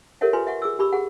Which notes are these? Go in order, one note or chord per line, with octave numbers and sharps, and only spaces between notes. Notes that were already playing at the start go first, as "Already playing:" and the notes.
G4 A4 A#4 C#5 E5 F#5
F4 B4 G#5 C6
E5 F#5 C#6
G#4 D6 E6
G4 B5 C#6 D6 E6
G#4 F#5